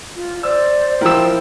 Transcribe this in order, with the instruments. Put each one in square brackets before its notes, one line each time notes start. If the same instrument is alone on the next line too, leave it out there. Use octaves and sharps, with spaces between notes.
[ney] F4
[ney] C5 [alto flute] D5 [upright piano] E6
[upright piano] F3 A#4 [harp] E4 E6 [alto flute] G5